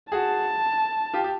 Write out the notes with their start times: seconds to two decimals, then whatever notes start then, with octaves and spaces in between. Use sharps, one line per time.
0.12 F#4 G#4 A5
1.14 F4 G4
1.24 G4